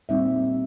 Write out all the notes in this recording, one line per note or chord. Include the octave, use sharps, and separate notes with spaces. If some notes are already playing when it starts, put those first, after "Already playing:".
A#2 G3 C4 D#4 E5